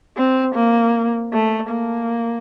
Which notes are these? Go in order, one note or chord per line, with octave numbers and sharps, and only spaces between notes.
C4
A#3
A3
A#3